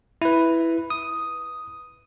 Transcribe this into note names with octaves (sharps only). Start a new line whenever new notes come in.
E4 B4
D#6